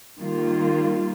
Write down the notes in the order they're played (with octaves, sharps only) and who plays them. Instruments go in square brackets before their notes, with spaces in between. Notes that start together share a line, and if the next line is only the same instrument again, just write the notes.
[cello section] D#3 G3 A#3 F4